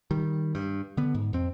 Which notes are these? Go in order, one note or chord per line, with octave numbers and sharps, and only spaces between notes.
D#3 G3
G2
D3 B3
G#2
F2 C4